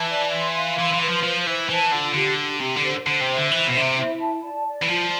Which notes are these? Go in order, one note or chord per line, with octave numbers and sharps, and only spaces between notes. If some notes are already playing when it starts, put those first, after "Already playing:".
Already playing: E3 A5
D5
C6
F5
E3 C6
E3
B4
F3
F3 C5
E3 C5
E3 A5
D3 F4
D3 G4
G4
C3 G4
D3
C5
D3 C5
C3
E5
D3
E3 C5
B2
D3 E5
C3
E4
A5
D5
D5
E3
F3 F4